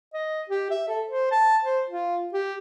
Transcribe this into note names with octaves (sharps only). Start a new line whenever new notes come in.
D#5
G4
E5
A4
C5
A5
C5
F4
G4